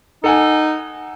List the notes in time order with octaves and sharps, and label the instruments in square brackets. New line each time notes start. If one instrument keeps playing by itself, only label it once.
[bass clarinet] D#4 [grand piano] A4 F#5 G#5